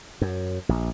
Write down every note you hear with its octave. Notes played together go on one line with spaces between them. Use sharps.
F#2
A#1